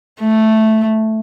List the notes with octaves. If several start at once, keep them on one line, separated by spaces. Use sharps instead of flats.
A3